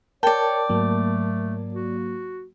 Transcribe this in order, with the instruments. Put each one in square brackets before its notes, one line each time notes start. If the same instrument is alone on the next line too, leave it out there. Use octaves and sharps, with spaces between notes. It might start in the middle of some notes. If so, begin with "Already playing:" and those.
[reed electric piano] A#4 A5 [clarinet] C#5 [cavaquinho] D5 G5
[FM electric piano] G#2 F#3 A#3 [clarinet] A3
[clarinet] F#4